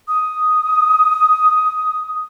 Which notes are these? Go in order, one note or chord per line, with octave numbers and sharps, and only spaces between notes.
D#6